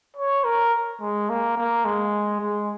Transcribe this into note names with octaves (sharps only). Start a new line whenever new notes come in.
C#5
A#4
G#3
A#3
A#3
G#3
G#3